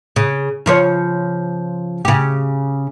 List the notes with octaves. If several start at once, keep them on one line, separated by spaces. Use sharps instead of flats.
C#3
C#3 F3 C#5
C#3 G4